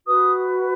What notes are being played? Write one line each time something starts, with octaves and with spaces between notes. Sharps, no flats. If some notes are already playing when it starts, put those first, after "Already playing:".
F#4 B4 D#6